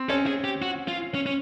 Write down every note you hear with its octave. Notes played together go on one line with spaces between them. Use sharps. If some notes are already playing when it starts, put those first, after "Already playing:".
Already playing: C4
C#4 A4
G#4
G4
F#4
F4
C#4
C#4